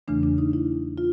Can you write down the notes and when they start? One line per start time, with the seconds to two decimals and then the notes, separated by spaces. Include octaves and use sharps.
0.08 E2 C#3 E3 A3 D4
0.23 D4
0.38 D#4
0.53 E4
0.98 F4